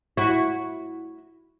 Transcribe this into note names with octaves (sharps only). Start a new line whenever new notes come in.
E4 F#4